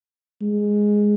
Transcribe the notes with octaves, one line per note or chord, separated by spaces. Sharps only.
G#3